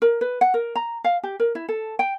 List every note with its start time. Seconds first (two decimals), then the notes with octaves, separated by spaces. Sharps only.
0.02 A#4
0.21 B4
0.41 F#5
0.54 A#4
0.76 A#5
1.04 F5
1.24 G4
1.40 A#4
1.55 E4
1.69 A4
1.99 G5